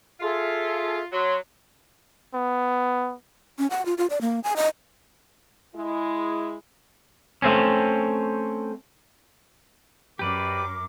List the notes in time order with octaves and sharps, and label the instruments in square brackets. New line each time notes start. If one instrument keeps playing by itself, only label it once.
[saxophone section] F4 [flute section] G#4 A4 E5
[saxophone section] F#3 [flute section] C6
[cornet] B3
[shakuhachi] C#4
F#5
F4
F4
D5
A#3
G#5
D#5
[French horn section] G#3 E4
[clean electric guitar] A3 C4 C#4
[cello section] F#2 [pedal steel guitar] G4 B4 D5 [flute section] A#4 D6